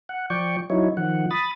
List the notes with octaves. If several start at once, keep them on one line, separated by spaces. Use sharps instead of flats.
F#5
F3 D5 G5 C#6
F#3 D#4 E4 C#5
D#3 F3 F#5
B5 D#6 A6